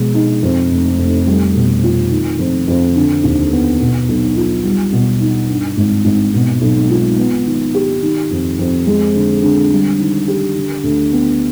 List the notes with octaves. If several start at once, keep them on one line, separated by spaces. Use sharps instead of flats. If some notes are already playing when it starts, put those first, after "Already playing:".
Already playing: B2 F3 G#3
D#4
F2
F1
F1
G3
B2
F4
D#3
F2
F2
D3
D#2
B3
B2
B1
F4
G3
B2
D#4
G2
G#1
G#1
B2
B1
F4
B3
D#3
G4
D#3
F2
F2
G#3
D3
D3
G3
D#3
G4
D3
D2
B3